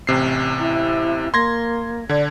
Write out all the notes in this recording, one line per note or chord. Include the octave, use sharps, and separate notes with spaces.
A1 C3 C7
E4
A#3 C6 G#6 A#6
D3 D5 G#6